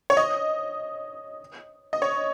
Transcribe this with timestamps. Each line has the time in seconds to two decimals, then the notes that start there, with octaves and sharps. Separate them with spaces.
0.10 C#5
0.17 D#5
1.93 D#5
2.02 C#5